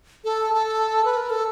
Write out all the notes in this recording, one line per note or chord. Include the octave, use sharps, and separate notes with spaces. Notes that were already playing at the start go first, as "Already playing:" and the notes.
A4
A4
B4
A#4
A4